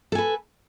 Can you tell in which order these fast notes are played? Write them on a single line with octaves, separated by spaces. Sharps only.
A4 G#5 B4